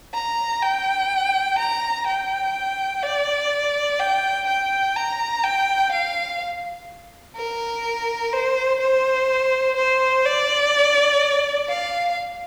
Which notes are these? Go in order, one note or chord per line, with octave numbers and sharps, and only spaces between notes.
A#5
G5
A#5
G5
D5
G5
G5
A#5
G5
F5
A#4
C5
C5
C5
D5
F5